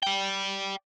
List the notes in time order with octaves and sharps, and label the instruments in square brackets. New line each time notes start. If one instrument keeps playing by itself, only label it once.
[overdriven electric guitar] D5 G5